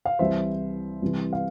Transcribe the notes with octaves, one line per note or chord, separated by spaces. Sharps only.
F5
C2 C3 E3 C5 E5
C2 C3 E3
F5